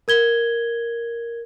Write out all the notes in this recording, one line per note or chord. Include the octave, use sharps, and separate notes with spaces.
A#4 G#6 G7